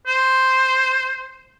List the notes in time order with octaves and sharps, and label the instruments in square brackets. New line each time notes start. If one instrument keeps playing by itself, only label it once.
[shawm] C5